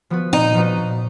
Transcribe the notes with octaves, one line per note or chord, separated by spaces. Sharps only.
F3 B3 F#4 B4
A#2 D#4
F3 B3 F#4 B4
A#2